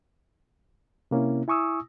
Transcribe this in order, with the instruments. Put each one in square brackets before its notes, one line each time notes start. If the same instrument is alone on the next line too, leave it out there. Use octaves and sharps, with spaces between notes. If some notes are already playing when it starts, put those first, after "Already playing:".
[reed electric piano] C3 A#3 C#4 E4
E4 G#5 C#6 D#6 E6